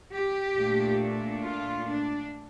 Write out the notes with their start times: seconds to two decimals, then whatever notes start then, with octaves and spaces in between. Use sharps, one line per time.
0.13 G4
0.56 A#2 A3 D4
1.43 F4
1.87 D4